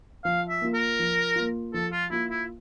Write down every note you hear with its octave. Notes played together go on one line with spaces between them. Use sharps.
F3 F5
E5
A#3 F4
A#4
F3
A#3 F4
F3 A4
F4
A#3 E4 F4
E4